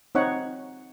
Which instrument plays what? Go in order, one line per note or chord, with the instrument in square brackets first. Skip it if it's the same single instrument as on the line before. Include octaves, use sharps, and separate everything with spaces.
[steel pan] C4 D#4 C#5 F#5